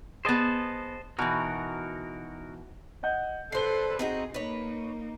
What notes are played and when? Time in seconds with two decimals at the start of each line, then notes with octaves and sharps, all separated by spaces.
0.25 B3 G#4 C5 D#5 A5
1.19 B2 E3 D#4 F#4 A#4
3.03 D#5 F#5 G6
3.52 D3 A4 B4 C5 C7 G7
3.99 C4 D#4 F#4 G#4
4.34 A#3 D#4 B4 C#5